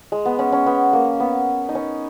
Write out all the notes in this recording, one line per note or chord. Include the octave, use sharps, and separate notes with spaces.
G#3
B3
C#4
C#4
B3
A#3
B3
D#4
C#4